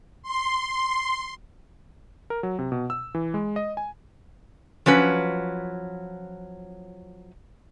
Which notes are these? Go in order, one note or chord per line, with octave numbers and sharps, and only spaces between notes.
C6
A#4
F#3
C3
B2
E6
E3
G#3
D#5
G#5
F3 F#3 C#4 B4